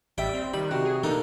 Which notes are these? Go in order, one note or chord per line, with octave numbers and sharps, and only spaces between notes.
A1 G3 E5 G5
C4
D#3 G3 B5
C3 F#4
G#4
B2 A#3 D4 D#4 A4